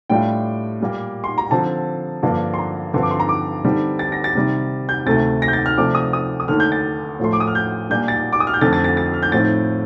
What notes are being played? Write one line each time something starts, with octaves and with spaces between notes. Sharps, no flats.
A2 G3 D4 F4 G5
A#2 G3 A#3
C6
A#5
D3 F3 C4 A5
G2 D3 F3 A#3 D4
C6
A#5
G2 D3 F3 C4 C6
D6
C6
A#5
D6
D3 G3 C4 D#4
A6
A#6
A6
C3 D#3 G3
G6
D2 C3 D#3 A3 A6
A#6
G6
A6
F6
C3 F3 A3 D4 D6
D#6
D#6
D#6
D#2 D3 A3 D#4 F6
G6
A6
A2 F3 A3 C6
D6
D#6
F6
G6
A#2 G3 A#3 D4 G6
A6
D6
D#6
F6
G6
F2 D3 A3 C4 A6
A6
A6
A6
F6
G6
A2 F3 C4 D#4 A6